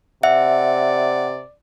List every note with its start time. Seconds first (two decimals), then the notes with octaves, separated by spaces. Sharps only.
0.23 C3 D5 E5 F#5